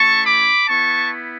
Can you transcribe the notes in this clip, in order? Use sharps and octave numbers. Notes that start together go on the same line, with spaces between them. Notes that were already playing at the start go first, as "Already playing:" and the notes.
Already playing: A3 C#4 E4 A5 C#6
B5 D6
B3 E4 A5 C#6